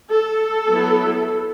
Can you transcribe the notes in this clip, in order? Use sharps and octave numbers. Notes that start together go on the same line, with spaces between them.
A4
F#3 B3 E4